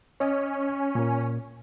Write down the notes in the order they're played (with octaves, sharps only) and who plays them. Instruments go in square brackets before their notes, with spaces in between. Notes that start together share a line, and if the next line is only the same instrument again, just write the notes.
[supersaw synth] C#4 [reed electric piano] C#5 D#5
[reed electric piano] A#2 A#3